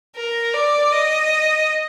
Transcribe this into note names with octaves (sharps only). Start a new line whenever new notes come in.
A#4
D5
D#5